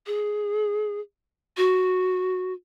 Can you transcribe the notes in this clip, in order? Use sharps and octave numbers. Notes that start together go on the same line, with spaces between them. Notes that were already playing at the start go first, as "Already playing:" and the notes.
G#4
F#4